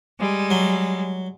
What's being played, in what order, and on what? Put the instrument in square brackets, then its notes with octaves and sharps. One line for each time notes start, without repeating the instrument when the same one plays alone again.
[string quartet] G3 G#3
[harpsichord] F#3